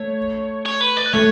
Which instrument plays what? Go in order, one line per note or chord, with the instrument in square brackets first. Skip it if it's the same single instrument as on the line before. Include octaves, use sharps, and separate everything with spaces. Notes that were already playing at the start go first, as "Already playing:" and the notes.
Already playing: [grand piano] A3 [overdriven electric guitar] C#5
[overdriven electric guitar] C#5
B4
D5
B4
[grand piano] A3 [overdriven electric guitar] C#5